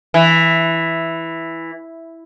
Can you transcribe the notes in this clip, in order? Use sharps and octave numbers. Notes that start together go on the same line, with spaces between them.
E3